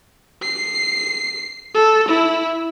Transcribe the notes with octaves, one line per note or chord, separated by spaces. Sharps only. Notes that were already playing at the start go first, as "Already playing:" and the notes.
C7
A4
E4